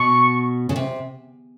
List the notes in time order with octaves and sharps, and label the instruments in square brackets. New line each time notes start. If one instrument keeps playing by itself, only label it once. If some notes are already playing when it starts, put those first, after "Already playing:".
Already playing: [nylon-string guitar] B2 [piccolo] C#6
[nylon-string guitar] C#3
C3